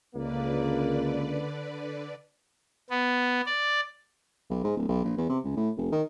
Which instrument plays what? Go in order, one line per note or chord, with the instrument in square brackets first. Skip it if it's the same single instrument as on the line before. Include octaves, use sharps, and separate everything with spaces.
[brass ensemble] C#2 A#3 [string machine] D3 B4 D5
[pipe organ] B3
D5
[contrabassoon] B1
G#2
D1
B1
A#1
E2
C3
C#2
A2
F1
D#3